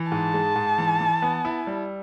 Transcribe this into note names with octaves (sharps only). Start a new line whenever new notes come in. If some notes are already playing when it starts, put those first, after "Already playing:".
Already playing: E3
G#2 A5
G#3
G#2
E3
E3
B3
E4
G3